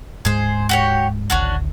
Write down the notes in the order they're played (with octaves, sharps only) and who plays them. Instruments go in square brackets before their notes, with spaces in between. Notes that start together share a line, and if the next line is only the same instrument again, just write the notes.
[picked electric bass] D1 G#2 G#3 [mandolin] G#4 C5
[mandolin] F#4 G4 C#5
[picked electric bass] D1 G#1 D2 [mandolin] C#4 D4 F#4